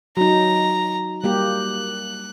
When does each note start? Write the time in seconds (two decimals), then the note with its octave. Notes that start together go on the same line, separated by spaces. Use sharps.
0.17 F#3 D#4 F#4 A#5
1.24 G3 A#3 G4 F#6